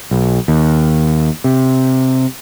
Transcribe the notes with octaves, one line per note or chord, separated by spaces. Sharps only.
B1
D#2
C3